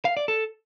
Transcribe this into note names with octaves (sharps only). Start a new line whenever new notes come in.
F5
D5
A4